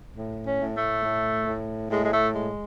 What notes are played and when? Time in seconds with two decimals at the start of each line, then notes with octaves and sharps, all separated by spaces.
0.17 A2
0.46 C#4
0.61 A2
0.75 A3
1.03 A2
1.47 A2
1.90 A2 G#3
2.04 G#3
2.12 A3
2.33 G#3